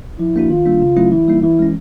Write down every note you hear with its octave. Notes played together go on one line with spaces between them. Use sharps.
F3 E4
A#3 D4 F#4
D#3 F4
G3 A#3 D4
C#3
F#3 A3 C#4 E4
E3 E4
G3 A#3 D#4
E3 E4
G#3 C#4